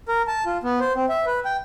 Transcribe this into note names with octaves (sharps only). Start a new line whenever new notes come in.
A#4
A5
F4
B3
C5
C4
E5
B4
G5